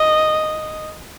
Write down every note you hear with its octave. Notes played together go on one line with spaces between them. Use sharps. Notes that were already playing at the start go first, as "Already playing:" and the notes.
Already playing: D#5